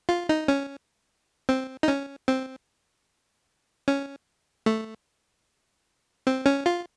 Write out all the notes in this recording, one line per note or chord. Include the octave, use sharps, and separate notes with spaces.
F4
D#4
C#4
C4
D#4
C#4
C4
C#4
A3
C4
C#4
F4